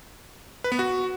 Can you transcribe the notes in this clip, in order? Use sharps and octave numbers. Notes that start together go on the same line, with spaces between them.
B4
B3
F#4